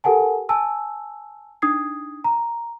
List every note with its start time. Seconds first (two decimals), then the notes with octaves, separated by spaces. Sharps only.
0.04 G4 A4 A#4 F#5 G#5 A5
0.49 G#5 A5 E6
1.62 D4 D#4 D#6 G#6 C7
2.24 A#5